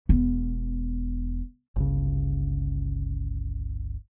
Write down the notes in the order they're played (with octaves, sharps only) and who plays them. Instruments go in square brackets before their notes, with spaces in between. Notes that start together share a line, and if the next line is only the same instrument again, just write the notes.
[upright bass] E1 B3
[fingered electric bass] G1 C#2 C#3